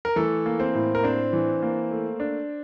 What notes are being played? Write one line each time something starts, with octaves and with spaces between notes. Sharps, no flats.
A#4
E3 A3 A4
A#3
C4 C5
A2
A#4
C4 D4 C5
E3
A#3
A3
D4